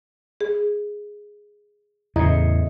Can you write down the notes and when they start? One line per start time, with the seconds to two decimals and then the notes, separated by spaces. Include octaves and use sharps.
0.41 G#4
2.16 E2 A2 C#3 E4 D#5 A#5